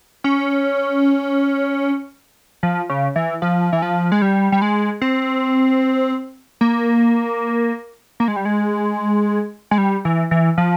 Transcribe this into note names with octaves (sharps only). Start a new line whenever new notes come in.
C#4
F3
C#3
E3
F3
E3
F3
G#3
G3
G3
G#3
C4
A#3
A#3
G#3
G3
G#3
G#3
G3
E3
E3
F3